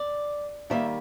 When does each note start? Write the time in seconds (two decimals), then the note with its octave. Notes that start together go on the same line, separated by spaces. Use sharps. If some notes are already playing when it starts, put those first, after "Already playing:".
Already playing: D5
0.70 D#3 G3 A#3 E5